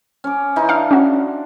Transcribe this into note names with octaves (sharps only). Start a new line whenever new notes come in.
C#4 D6
E3 D#4 C6
D4 F5
C#4 F#4